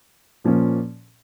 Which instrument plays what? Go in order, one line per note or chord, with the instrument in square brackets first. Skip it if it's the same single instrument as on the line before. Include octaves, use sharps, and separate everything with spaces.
[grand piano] A#2 F3 A#3 C#4